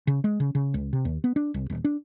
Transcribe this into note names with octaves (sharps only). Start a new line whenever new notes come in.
C#3
G#3
C#3
C#3
C#2
C3
D#2
B3
D4
C2
D#1
D4